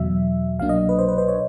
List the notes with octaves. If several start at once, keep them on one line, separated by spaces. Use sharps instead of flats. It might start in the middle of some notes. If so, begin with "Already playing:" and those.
Already playing: E2 B2 F#3 E5
C2 B2 F#3 A#3 D4 F5
D#5
B4
C5
B4
C5
C#5